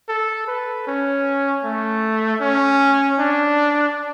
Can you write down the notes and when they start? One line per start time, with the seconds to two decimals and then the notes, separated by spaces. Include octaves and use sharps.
0.09 A4
0.47 B4
0.87 C#4
1.64 A3
2.41 C#4
3.19 D4